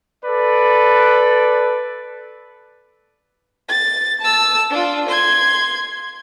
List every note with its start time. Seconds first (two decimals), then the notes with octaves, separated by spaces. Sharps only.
0.25 A4 B4 D5
3.69 A6
4.21 A5 E6
4.70 D4 F4
5.09 C6 G#6